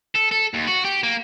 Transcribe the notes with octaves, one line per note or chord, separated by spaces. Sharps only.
A4
A4
D#2
F#4
G4
A#3